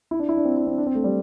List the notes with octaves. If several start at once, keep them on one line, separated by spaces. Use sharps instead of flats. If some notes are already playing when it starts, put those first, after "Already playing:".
E4
D4
E4
D4
C4
E4
C4
D4
C4
A3
G3